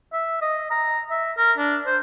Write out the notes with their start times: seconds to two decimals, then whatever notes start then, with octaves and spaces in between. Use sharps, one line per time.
0.13 E5
0.41 D#5
0.71 A#5
1.11 E5
1.37 A#4
1.58 D4
1.86 C5